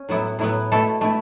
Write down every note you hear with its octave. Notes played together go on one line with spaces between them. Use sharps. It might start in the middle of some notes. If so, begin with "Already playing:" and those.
Already playing: C#4
A2 F#3 B3 E4
A2 F#3 B3 E4
B2 A3 E4 A4
B2 A3 E4